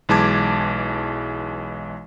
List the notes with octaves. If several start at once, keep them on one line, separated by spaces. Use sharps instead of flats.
B1 E3 G#3 A5 D6 G#6